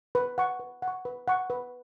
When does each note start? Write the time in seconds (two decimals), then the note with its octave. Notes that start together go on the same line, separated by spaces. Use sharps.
0.15 B4
0.38 F#5 C#6
0.60 B4
0.82 F#5
0.88 C#6
1.05 B4
1.28 F#5 C#6
1.50 B4